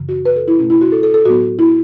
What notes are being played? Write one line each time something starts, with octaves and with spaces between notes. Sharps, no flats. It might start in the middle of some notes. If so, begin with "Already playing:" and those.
Already playing: F#2 C#3 E3
F#4
B4
A4
E4
B2 A3 C#4
E4
F#4
A4
A4
A4
A2 F#3 B3 F#4
E4